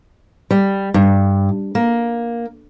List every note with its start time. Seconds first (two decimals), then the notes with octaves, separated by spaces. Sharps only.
0.51 G3
0.94 G2
1.75 A#3